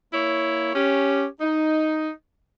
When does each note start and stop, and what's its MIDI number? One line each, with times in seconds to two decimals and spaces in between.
0.14 0.74 58
0.14 0.74 64
0.14 0.74 73
0.75 1.26 61
0.75 1.26 67
1.40 2.11 63